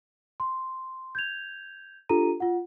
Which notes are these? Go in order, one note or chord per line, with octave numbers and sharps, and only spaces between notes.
C6
G6 G#6 F7
D4 F4 G4 A4 A#5 D#7
F4 F#5